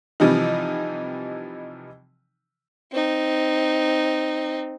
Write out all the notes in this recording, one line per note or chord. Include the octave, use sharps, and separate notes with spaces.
C3 E3 F3 G3 D#4
C4 D#4